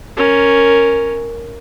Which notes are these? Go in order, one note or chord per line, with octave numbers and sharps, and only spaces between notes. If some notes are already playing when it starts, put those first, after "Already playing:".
C#4 A#4